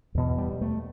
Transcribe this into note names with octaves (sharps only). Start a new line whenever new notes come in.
E2 B2
G3
A3